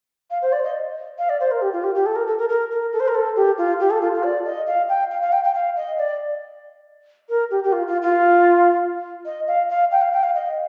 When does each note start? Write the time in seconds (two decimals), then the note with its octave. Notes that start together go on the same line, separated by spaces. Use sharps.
0.31 F5
0.42 C5
0.52 D5
0.64 D#5
1.18 F5
1.29 D5
1.40 C5
1.51 A#4
1.62 G4
1.73 F4
1.84 G4
1.95 G4
2.06 A4
2.16 A#4
2.27 A4
2.38 A#4
2.49 A#4
2.71 A#4
2.93 A4
3.00 C5
3.08 A#4
3.15 A4
3.36 G4
3.58 F4
3.80 G4
3.90 A4
4.02 F4
4.13 F4
4.23 D5
4.45 D#5
4.67 F5
4.89 G5
5.11 F5
5.22 F5
5.32 G5
5.44 G5
5.54 F5
5.77 D#5
5.98 D5
7.29 A#4
7.51 G4
7.64 G4
7.72 F4
7.87 F4
8.02 F4
9.25 D#5
9.47 F5
9.70 F5
9.91 G5
10.02 F5
10.13 G5
10.23 F5
10.35 D#5